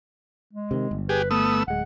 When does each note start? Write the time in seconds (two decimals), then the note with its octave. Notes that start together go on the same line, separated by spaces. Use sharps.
0.53 G#3
0.71 C3 D#3
0.91 G1
1.09 G4 G#4 B4
1.31 A3 B3 D#6 E6
1.68 D1 G#3 F#5